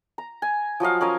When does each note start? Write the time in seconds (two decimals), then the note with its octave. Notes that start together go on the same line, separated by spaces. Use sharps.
0.18 A#5
0.42 G#5
0.80 F3 F#3 D#5 F5
1.01 C#4 A#4 D#5 G#5